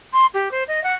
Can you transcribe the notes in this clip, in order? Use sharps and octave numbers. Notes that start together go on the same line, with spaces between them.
C6
G4
C5
D#5
F#5